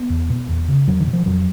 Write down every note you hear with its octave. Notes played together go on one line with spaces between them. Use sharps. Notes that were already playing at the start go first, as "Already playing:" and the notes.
Already playing: B3
E2
B2
E2
C#3
E2 F#3
D#3
B2
F3
F2 F#3